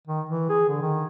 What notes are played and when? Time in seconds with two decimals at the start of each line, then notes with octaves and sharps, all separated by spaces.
0.07 D#3
0.29 E3
0.49 G#4
0.68 D3
0.82 D#3